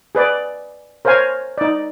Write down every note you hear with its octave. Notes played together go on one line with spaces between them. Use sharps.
G#4 B4 D5
A#4 C5 C#5 F5 G#5
D#4 D5